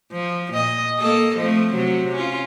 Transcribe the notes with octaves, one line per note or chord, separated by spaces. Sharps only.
F3
A#2 D#5
A#3 A4 D#5
F3 A3 C4
C3 F#3
C#4 F4